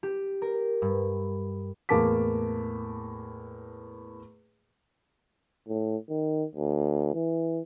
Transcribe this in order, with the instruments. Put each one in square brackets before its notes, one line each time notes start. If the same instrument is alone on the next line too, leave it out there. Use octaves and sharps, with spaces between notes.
[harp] G4
A#4
G2
[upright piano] E2 A2 A#3 A5 D6 B6
[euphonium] A2
D#3
D2
E3